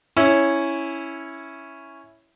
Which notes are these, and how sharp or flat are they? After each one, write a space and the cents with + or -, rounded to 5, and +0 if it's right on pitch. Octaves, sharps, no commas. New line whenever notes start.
C#4 +0 E4 +0